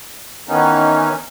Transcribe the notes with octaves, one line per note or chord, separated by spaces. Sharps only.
D#3 E3 B3 C#4 D#4